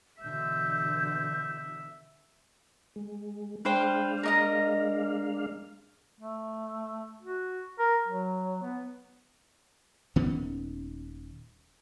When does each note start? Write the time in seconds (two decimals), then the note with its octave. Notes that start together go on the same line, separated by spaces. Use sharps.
0.22 B2 D3 E3 E5 G6
2.96 G#3
3.65 G#3 D4 B4 C5 F5 G5
4.23 A#4 D#5 A#5
6.20 A3
7.22 F#4
7.79 A#4
8.08 F#3
8.62 B3
10.16 D#1 D#3 B3 C#4